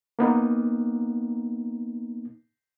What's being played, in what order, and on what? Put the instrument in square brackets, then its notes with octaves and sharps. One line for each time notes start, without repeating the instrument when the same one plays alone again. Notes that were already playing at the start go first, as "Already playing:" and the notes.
[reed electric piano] A#3 B3 D#4